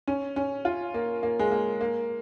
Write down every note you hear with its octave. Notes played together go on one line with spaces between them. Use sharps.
C#4
C#4
F4
A#3
A#3
G#3
A#3
A#3